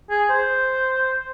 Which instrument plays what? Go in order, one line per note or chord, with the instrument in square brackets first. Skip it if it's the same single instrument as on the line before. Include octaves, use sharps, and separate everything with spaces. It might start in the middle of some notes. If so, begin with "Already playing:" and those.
[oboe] G#4
C5